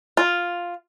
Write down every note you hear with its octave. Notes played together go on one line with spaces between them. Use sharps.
F4